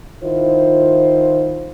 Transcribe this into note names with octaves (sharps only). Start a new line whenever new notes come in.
D#3 E4 F4 C5